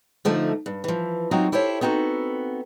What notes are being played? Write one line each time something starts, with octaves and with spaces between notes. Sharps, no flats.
D3 F3 A3 D#4
G2
E3 F3
F#3 C4 D#4 F4 F#4 A#5
E4 G4 A4 C5 C#5
B3 C4 D#4 F#4 A4